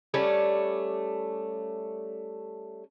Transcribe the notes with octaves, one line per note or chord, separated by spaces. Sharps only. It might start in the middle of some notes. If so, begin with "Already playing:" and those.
G3 A3 C#4 D5